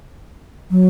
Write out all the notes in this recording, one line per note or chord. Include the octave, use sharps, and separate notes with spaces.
F#3